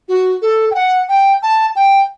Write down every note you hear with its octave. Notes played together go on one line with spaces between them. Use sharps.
F#4
A4
G5
F#5
G5
A5
G5